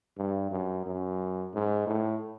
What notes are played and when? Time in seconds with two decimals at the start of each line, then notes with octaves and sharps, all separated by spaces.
0.18 G2
0.51 F#2
0.86 F#2
1.54 G#2
1.87 A2